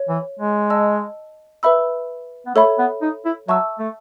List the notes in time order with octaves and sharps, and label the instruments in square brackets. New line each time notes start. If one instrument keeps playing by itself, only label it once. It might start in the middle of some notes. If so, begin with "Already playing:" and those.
Already playing: [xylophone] C#5
[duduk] E3
G#3
[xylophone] D#5 A5 E6
B4 E5 B5 E6
[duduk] B3
[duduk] A3 [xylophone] A4 C#5 E5 B5
[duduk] B3
D#4
E4
[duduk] F#3 [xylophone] E5 A5 C#6 E6
[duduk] A3